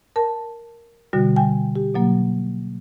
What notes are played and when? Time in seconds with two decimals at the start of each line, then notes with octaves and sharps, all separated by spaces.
0.16 A#4 A5
1.13 B2 D3 G3 F#4
1.36 G5 G#5
1.76 G4
1.95 B2 F#3 A#3